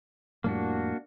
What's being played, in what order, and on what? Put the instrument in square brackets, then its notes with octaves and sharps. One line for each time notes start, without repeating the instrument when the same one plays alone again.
[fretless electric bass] F2 A2 G3 [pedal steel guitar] A#3 D4 F#4